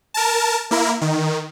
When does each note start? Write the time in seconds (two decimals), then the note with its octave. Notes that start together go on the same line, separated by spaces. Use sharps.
0.14 A#4 A5
0.71 A#3 E4 A#4
1.01 D#3